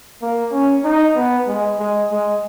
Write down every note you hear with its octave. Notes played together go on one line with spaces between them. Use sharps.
A#3
C#4
D#4
B3
G#3
G#3
G#3